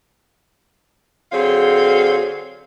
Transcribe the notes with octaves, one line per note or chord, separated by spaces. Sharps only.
D3 F#3 C4 G#4 F5